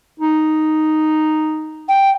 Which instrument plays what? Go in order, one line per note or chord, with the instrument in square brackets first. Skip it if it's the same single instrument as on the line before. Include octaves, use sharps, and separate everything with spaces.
[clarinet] D#4
[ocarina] G5